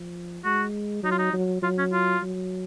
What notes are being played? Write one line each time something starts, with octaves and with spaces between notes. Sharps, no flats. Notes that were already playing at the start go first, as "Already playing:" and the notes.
Already playing: F3
G#3 F#4
F#3 D#4
F4
D#4
F#3
F#3 F4
C#4
F4
F#3